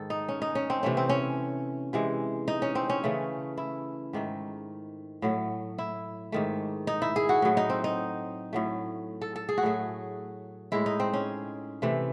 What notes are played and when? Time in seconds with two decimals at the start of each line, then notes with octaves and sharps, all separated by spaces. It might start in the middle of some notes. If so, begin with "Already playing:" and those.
Already playing: G#2 D#3 A4
0.10 D#4
0.29 C#4
0.42 D#4
0.55 C#4
0.70 C4
0.83 C3 E3 A3 C#4
0.97 C4
1.09 C#4
1.93 C3 E3 G#3
2.48 D#4
2.62 C#4
2.75 C4
2.90 C#4
3.04 C#3 E3 A3
3.58 E4
4.13 G#2 D#3 A3
5.22 A2 F#3 A3
5.78 E4
6.32 G#2 D#3 A3
6.87 D#4
7.02 E4
7.16 G#4
7.29 F#4
7.42 A2 F#3 A3
7.57 D#4
7.70 C4
7.84 D#4
8.53 A2 F#3 A3
9.21 A4
9.36 A4
9.49 G#4
9.58 F#4
9.63 A2 F#3 A3 G#4
10.72 A2 G#3 E4
10.86 D#4
11.00 C4
11.13 C#4
11.82 C3 E3 A3